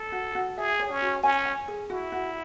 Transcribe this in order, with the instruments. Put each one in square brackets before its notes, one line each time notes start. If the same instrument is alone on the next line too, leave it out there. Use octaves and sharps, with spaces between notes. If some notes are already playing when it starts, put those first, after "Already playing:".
Already playing: [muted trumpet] A4
[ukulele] F#4
F#4
[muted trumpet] G#4 [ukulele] E5
[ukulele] C#5
[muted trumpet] C#4
[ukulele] F#4
[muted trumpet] C#4 [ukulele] G#5
[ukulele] G#5
G#4
[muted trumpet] E4 [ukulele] F#4
[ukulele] F#4